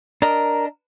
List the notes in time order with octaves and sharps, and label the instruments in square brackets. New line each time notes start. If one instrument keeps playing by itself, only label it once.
[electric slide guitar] D4 D#5 [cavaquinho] A#4